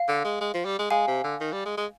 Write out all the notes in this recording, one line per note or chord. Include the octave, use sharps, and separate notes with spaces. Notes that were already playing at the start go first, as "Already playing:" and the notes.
Already playing: F5
D3
G#3
G#3
F3
G3
G#3
G#3 F5 G#5
C3
D3
D#3
G3
G#3
G#3